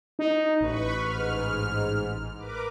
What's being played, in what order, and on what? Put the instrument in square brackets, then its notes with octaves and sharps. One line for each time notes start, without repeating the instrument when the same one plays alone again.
[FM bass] D#4
[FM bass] A1 [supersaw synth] B4 B5 C#6
[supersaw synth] G#2 F6
A#4 B4 D6